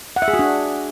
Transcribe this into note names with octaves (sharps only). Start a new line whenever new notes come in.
F#5
E5
G#4
F#4
D4